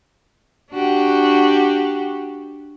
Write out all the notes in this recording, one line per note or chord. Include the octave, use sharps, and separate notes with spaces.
D4 F#4 G4